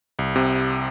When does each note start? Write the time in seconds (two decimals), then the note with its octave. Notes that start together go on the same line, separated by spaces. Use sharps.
0.19 C2
0.36 C3